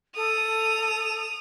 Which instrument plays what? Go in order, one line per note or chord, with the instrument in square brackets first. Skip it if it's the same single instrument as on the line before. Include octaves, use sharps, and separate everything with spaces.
[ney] A4 [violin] D#6 F7